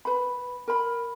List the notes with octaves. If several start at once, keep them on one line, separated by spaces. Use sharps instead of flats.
B4 B5
A#4 B5